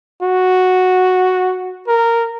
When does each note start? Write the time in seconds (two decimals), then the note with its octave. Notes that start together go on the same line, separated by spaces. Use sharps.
0.22 F#4
1.87 A#4